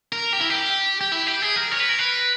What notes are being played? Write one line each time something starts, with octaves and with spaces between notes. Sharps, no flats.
A#4
G4
E4
G4
G4
E4
G4
G#4
A#4
C#5
B4
A#4
B4